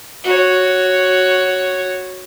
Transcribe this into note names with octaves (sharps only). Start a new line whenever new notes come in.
F#4 C#5